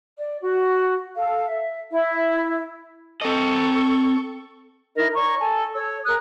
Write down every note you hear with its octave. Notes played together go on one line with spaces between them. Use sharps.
D5
F#4
A4 F5
E5
E4 E5
C4 A4 D#5 C#6
D#4 E4 A#4 D#5
C#5 D5 A#5 C#6
A4 G#5 A5
A4 C#5 E6
G#4 A#4 D#6 F#6